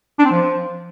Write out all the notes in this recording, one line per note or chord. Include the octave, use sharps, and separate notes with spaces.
D4
C4
F3